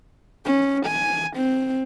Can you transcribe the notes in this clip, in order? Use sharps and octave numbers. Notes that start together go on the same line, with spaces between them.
C#4
G#5
C4